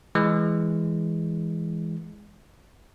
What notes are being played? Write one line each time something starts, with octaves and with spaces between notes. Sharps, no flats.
E3 G#3